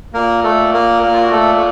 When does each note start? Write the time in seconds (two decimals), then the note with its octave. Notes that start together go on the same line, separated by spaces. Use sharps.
0.14 A#2 A#3 A#4
0.44 A3 A4
0.73 A#3 A#4
1.03 A#3 A#4
1.13 F4
1.23 F#4
1.31 A3 A4
1.54 A4